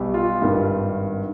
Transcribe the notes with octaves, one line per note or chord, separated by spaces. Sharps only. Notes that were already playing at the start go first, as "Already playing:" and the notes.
Already playing: B1 B2 G3
F4
G#1 G2 D#3